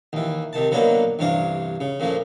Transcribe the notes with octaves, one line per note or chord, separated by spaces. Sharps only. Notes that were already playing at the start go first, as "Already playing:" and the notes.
D#2 E3
C3 D#3 A5
D3 F#3 A#3 B3 D4 D#4
A1 G2 C3 D4 F5
C#3
A#2 C#3 F3 A3